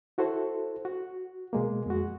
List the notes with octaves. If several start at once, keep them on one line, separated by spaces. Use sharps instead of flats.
E4 F#4 A4 C5
F#4
B2 G#3 A#3
F2 G#3 F#4